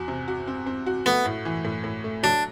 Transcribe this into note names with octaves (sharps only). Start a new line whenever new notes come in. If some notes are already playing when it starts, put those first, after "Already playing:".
Already playing: E2 F#4
C3
F#4
C4
C4
F#4
A3 B3
A2
E3
A2
A2
A3
F#3 D4